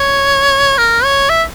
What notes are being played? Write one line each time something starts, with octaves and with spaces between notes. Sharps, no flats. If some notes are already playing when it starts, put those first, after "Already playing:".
Already playing: C#5
A#4
C#5
E5